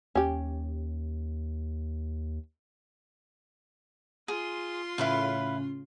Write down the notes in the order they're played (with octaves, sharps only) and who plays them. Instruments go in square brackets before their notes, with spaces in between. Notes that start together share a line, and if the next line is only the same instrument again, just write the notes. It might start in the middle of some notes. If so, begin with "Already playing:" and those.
[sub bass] D#2 [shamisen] C#4 G4
[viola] F4 C6 [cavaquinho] G#4
[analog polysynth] A2 C#3 C#4 [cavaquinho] E4 B4 F5